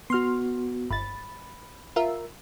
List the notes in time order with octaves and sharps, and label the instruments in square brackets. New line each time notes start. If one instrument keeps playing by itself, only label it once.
[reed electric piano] B3 F#4 [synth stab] C6 F6
[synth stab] G1 A6 [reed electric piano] B5
[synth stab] F4 A#4 E5